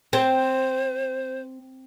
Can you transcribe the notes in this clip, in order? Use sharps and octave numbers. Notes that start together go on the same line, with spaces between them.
C4 C5